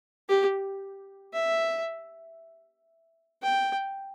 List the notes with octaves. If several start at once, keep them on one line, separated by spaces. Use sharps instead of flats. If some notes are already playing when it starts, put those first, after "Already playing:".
G4
E5
G5